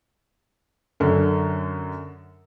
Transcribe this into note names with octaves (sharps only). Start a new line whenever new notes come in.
F#2 D3